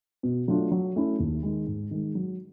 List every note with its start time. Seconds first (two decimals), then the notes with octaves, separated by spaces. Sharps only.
0.23 B2
0.48 F#3 A3 D4 F4
0.72 F#3
0.96 A3 C#4 E4 A4
1.19 D#2
1.43 D#3 G#3
1.67 G#2
1.91 D#3 G#3
2.15 F#3